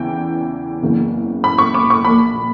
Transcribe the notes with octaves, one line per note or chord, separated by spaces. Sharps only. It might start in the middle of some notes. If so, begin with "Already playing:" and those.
Already playing: E2 C#3 E3 G5
F#1 E2 C#3 E3
B5
C#6
D6
C#6
A#1 A#2 B5